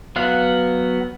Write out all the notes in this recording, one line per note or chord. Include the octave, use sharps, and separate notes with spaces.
F#3 B3 F5 F#5